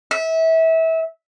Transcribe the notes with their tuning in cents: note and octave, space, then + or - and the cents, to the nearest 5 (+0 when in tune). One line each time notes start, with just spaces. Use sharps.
E5 -25